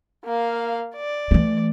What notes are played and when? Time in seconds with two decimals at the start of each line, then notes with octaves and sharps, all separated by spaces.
0.25 A#3 F5
0.96 D5
1.31 E3 A3